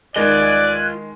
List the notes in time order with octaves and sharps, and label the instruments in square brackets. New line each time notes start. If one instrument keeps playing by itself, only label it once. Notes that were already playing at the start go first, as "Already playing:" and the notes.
[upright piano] D#3 G#3 [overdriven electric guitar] F4 D#5 [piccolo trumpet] D5 [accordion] G#5 F#6